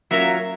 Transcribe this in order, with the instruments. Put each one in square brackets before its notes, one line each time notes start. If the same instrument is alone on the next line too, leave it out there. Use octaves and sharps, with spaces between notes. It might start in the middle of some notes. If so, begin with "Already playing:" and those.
[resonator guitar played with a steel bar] F#3 A#3 C#4 F4 A#4 [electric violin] E5